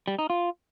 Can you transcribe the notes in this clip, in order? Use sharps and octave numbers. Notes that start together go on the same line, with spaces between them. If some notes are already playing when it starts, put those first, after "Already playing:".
G3
D#4
F4